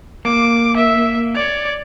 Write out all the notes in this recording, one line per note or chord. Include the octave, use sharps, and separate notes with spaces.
A#3 D6
E5
C#5 D5